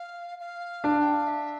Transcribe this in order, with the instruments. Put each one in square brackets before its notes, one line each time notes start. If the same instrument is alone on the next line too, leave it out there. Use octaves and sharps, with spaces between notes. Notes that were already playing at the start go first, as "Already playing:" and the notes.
Already playing: [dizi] F5
F5
[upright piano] D4
[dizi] G5
F5
E5